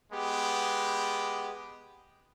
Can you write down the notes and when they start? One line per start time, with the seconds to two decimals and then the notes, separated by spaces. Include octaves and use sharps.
0.13 G#3 B3 G4